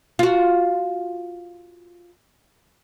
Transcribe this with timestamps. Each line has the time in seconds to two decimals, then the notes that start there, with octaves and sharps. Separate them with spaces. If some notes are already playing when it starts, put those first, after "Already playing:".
0.19 F4 F#4